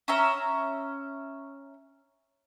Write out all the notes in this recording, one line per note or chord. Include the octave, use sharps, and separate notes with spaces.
C#4 E5 A#5